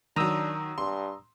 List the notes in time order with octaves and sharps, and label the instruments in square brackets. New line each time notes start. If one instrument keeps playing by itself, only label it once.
[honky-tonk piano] D#3 F#3 [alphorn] D4 [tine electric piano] A#5 D#6 E6
[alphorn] G2 [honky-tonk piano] C6